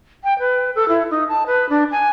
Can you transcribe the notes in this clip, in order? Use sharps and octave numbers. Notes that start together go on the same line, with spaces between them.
G5
B4
A4
E4
D#4
A5
B4
D4
G#5